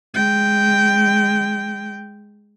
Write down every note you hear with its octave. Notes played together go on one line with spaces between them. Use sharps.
G#3 G5